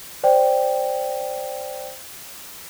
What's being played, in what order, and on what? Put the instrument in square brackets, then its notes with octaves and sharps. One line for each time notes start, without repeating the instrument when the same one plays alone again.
[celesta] C5 D5 G5